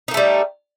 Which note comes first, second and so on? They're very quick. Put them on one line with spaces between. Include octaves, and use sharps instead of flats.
D#4 A#3 A3 G3